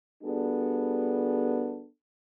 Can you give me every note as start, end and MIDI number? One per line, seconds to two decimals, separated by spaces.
0.23 1.85 55
0.23 1.85 59
0.23 1.85 62
0.23 1.85 66
0.23 1.85 68
0.23 1.85 69